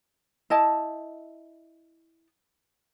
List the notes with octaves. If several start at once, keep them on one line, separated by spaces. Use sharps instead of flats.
E4 D#5 A5